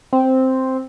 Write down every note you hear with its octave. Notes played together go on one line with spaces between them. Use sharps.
C4